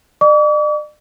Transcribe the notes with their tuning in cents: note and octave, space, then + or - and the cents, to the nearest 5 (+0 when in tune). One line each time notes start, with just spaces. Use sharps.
D5 +40 D6 -45